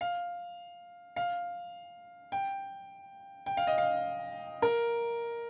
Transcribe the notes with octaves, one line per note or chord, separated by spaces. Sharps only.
F5
F5
G5
G5
F5
D#5
F5
A#4